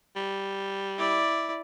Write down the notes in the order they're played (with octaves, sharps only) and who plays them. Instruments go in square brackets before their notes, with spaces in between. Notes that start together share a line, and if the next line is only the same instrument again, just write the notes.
[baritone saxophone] G3
[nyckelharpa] E4 D5